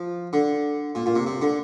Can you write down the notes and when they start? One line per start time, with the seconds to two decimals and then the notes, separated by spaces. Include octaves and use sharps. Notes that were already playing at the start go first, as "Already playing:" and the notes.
Already playing: F3
0.33 D3
0.95 A#2
1.06 A#2
1.16 C3
1.26 C3
1.42 D3